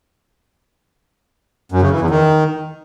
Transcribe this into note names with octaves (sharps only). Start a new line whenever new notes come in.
F#2
C#3
E3
E2
D#3